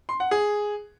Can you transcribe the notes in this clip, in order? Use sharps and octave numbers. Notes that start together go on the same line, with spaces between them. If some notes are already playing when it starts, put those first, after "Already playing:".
C6
F#5
G#4